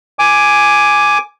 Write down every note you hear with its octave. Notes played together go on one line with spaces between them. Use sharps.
G#5 D6